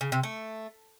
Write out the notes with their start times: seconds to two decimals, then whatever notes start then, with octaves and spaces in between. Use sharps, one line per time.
0.01 C#3
0.12 C3
0.23 A3